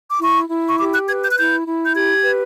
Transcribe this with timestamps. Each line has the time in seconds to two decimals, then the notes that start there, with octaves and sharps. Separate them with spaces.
0.11 D6
0.21 E4 C#6
0.50 E4
0.68 C#6
0.79 G4 D6
0.94 F#6
1.08 B4 G#6
1.22 G6
1.31 F#6
1.37 E4 G6
1.66 E4
1.84 G6
1.95 G4 G#6
2.24 B4